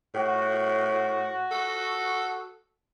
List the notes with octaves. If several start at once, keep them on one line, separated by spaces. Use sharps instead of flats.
A2 F#4
A4